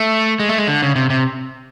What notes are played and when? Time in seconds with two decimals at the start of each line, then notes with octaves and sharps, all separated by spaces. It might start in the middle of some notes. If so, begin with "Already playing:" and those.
Already playing: A3
0.39 G#3
0.49 A3
0.58 G#3
0.68 D3
0.82 C#3
0.96 C3
1.10 C3